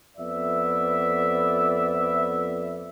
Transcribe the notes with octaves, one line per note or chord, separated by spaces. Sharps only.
F2 B3 D5 E5